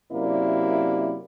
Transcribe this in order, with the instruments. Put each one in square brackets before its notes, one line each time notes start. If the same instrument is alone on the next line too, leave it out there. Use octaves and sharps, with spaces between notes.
[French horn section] F#2 C3 A#3 E4 D5